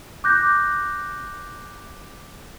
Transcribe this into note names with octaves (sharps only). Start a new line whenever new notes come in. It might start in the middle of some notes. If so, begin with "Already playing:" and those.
D6 F#6 G6 A#6